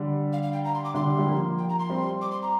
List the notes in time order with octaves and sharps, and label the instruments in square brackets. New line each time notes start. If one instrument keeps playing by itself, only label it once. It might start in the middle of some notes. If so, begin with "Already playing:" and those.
Already playing: [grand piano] D3 G3
[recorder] F5
F5
G5
A#5
C6
D6
[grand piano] D3 G3 [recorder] C6
[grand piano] G3
F3 A#3
[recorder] G5
A#5
C6
[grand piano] G3 C4
[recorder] D6
C6
A#5